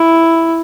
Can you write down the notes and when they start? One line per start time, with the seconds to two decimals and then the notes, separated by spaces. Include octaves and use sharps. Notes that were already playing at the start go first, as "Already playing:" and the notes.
Already playing: E4